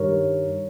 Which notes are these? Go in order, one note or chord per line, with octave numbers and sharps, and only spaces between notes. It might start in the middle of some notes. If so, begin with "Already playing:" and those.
Already playing: G2 D#3 G3 A#4 C#5